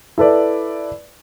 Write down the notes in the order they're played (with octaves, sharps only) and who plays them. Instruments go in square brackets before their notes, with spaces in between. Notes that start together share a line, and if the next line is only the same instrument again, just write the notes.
[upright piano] E4 A4 B4 D5